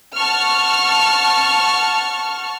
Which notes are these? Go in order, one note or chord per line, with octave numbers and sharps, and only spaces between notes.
F#5 A5 C#6 F6